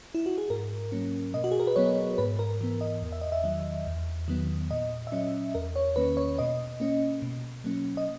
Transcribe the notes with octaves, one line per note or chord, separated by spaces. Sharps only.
E4
F#4
G#4
G#2 A#4
F#3 A#3 C#4
B2 D#5
F#4
G#4
A#4
B4
F#3 B3 C#5
G#2 B4
A#4
E3 B3
D#5
E2
E5
D#5
E5
D#3 F#3
E2
D#3 F#3 B3
A#2 D#5
E5
F#3 C#4 D#5
E2 A#4
C#5
D#3 A#3 C#4 B4
C#5
B2 D#5
A#3 C#4
B2
F#3 A#3 C#4
D#5